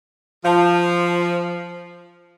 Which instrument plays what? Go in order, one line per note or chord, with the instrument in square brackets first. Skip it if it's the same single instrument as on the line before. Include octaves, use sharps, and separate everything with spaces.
[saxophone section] F3 [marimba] F5 A5